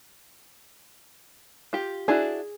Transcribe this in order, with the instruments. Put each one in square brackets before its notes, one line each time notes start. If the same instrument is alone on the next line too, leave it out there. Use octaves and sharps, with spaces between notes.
[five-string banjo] F4 G4
[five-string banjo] D4 E4 F#4 [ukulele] G#4